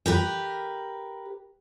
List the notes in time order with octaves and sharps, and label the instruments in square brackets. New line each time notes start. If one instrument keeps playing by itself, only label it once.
[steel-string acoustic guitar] G4 A#4 B4